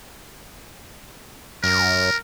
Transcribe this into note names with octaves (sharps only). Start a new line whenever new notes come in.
F#2 A#4